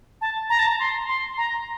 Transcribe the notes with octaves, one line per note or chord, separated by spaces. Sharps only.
A5
A#5
A5
A#5
C6
C6
A#5